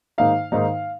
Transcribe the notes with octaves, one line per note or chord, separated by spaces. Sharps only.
G#2 D#3 A#3 D#4 F5
G#2 D#3 A#3 D#4